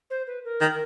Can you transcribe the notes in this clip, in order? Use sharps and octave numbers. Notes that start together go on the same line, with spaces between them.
C5
B4
A#4
D#3